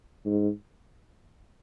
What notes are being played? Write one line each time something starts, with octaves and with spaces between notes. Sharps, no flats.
G#2